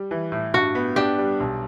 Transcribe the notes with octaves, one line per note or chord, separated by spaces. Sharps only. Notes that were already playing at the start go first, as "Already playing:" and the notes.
Already playing: G3
E3
A2
G2 F#4
B3
D4 G4
G3
B1